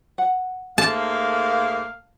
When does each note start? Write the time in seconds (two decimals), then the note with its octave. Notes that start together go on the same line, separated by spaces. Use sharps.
0.18 F#5
0.78 G#2 A3 A#3 F5 A5